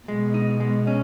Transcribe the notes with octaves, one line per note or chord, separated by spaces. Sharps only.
B2 G#3
D#4
G#3
C#4